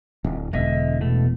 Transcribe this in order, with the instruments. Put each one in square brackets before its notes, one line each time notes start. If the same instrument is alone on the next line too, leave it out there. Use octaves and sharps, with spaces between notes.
[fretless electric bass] D1
[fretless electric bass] E1 [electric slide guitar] D3 D#5 E5
[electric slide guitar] B2 A3